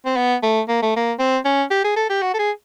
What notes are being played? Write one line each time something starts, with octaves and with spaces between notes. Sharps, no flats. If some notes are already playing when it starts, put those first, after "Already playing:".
C4
B3
A3
A#3
A3
A#3
C4
C#4
G4
G#4
A4
G4
F#4
A4
G#4